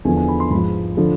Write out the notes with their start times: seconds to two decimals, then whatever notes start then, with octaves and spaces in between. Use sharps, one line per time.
0.05 E2 D3 F3 G#5
0.17 G#5
0.28 B5
0.40 C6
0.50 G#2 F3 B5
0.97 D3 F3